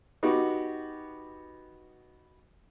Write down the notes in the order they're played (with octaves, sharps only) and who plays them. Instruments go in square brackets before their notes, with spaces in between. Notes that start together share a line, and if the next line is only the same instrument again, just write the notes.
[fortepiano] B3 D#4 F#4 G4